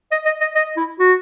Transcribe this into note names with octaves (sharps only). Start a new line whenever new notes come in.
D#5
D#5
D#5
D#5
E4
F#4